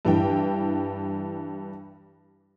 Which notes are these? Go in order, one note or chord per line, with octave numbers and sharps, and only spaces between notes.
G2 E3 G5